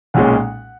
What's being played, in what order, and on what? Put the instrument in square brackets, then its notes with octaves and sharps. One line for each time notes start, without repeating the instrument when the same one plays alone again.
[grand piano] B1 A#2 G#3 C#4 F#5